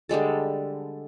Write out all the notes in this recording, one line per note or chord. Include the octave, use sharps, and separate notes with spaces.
D3 G3 G#3 A4